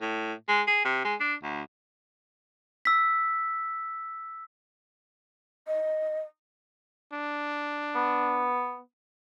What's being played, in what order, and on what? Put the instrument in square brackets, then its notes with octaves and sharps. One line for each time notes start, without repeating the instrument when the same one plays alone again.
[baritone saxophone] A2
G#3
G#4
C3
G#3
D4
D2
[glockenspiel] E6 B6
[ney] D#5
[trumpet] D4
[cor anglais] B3